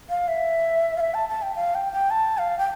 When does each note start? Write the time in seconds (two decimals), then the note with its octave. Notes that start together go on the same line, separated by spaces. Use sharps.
0.10 F5
0.28 E5
0.97 F5
1.01 E5
1.14 A5
1.29 A5
1.42 G5
1.56 F5
1.75 G5
1.93 G5
2.10 A5
2.38 F5
2.58 G5